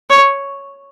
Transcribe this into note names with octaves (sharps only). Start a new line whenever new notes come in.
C#5